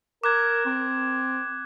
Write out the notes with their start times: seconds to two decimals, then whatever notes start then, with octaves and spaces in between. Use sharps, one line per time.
0.24 A#4 D6 F#6 G#6
0.66 C4